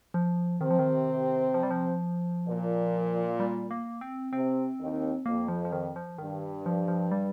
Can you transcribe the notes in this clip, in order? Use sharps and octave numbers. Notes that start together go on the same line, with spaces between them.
F3
C3 D#3 C4
F3
D#3
F3
G3
F3
A#2
G3
A#3
C4
C3 C4
D#2 D#3
F2 A#3
F3
F3
D#3
F3
G2 D#3
F3
F3
G3